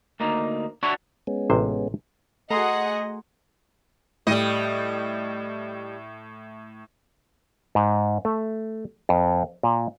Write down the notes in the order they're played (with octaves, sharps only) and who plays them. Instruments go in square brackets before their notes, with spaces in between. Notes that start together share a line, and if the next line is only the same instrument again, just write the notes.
[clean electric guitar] D2 A#3 D#4
D4 E4 F#4 C#5
[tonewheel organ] G#3 B3 C#4
[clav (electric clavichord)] A1 C3 C5
[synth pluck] A3 [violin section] F#4 G#4 F#5 [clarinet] D#5 [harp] A#5 C6 D#6
[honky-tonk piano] A2 [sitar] G3 D#5
[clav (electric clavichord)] G#2
A3
F2
A#2